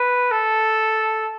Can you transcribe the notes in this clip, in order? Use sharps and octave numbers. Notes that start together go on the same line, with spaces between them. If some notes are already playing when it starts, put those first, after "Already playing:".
Already playing: B4
A4